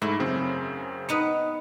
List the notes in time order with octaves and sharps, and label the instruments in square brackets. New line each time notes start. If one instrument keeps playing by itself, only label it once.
[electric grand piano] G#2 A3 [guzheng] E4
[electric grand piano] F#2 C#3 C4
[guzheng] B3 D#4 B4 [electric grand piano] C#7